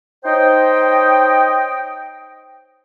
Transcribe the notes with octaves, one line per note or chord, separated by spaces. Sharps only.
D#4 C5 C#5 D#5 G5